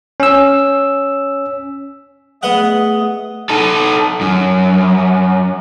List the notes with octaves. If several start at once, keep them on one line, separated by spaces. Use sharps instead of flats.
C#4 E6
A3 B3 G#4 D#5 F#5
D#4 A4
F#2